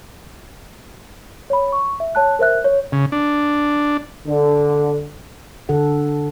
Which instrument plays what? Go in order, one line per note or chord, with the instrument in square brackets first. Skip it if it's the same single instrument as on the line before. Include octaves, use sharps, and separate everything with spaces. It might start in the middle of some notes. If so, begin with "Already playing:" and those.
[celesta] C#5 B5
C#6
E5
C#5 A5 F#6
A#4 C5 E5 F#6
C#5
[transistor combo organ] C#3
D4
[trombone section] D3
[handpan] D3 A4 F#5